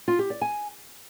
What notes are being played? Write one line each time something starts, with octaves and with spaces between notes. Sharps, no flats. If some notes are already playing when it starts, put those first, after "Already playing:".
F4
G4
D5
G#5